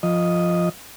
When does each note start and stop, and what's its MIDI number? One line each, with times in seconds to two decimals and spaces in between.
0.03 0.69 53
0.03 0.69 75